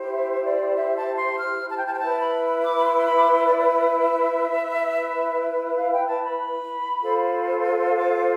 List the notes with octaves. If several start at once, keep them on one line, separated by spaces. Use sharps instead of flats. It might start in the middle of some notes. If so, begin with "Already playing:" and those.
Already playing: E4 G4 C5
E5
D5
E5
A5
C6
F6
A5
G5
A5
G5
E4 B4 A5
B5
D6
B5
C6
C6
B5
D6
C6
D5
D5
E5
E5
E4 B4
F5
G5
A5
B5
F4 A4 C5
C6
D6